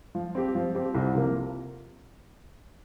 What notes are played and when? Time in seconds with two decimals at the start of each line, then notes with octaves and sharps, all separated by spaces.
0.15 F3
0.35 C4 G4
0.55 F3
0.75 C4 G4
0.95 C2
1.15 C3 F3 A#3